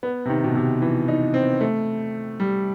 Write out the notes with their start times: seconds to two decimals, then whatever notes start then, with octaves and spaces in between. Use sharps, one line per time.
0.03 B3
0.25 C3
0.29 D#3
0.44 B2
0.55 C3
0.82 E3
1.08 D#4
1.34 C4
1.61 A3
2.40 G3